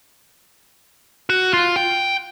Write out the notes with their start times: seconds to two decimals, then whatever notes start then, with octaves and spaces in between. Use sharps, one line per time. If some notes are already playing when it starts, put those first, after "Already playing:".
1.30 F#4
1.53 F4
1.76 G5